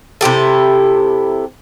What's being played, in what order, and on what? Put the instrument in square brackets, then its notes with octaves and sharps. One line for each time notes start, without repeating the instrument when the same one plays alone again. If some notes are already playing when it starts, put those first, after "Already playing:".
[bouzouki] C3 E4 G4 A4